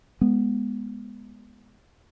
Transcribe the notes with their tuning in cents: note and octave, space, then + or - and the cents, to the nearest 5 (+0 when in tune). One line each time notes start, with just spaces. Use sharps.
G#3 +0 B3 -10